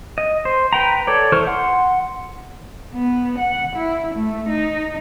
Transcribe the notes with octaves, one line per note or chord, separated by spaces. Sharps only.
D#5
C5
B4 G5 A#5
A4 C#5 D5
E3 A4 C5 C#6 F6
F#5 C6
B3
F#5
E4
A3
D#4